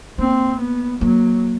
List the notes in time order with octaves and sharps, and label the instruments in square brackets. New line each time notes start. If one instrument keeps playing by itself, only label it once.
[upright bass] A#3 [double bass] C4
[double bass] B3
[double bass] F#3 [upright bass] A#3